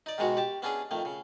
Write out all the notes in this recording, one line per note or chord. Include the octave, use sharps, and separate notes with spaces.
D#4 D5
G#2 B2 D#3 G#3 F#4
G4 A5
B3 C#4 D4 G#4
F2 D#3 A3
C#3